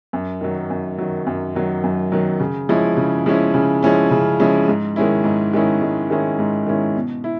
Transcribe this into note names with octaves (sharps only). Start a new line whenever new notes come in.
F#2
D#3 F#3
F#2
D#3 F#3
F#2
D#3 F#3
F#2
D#3 F#3
C#3
F3 G#3 C#4 E4
C#3
F3 G#3 C#4 E4
C#3
F3 G#3 C#4 E4
C#3
F3 G#3 C#4 E4
G#2
D#3 G#3 C#4 E4
G#2
D#3 G#3 C#4 E4
G#2
D#3 G#3 C#4 E4
G#2
D#3 G#3 C#4 E4
B2
E4